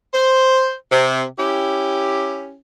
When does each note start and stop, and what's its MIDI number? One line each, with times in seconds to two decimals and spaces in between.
0.13 0.73 72
0.91 1.23 48
1.38 2.56 61
1.38 2.56 64
1.38 2.56 67